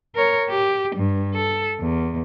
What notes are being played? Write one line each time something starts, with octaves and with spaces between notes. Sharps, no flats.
A#4 C#5
G4
G2
A4
E2